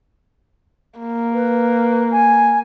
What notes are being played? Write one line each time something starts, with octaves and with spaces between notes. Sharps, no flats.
A#3
B4
G#5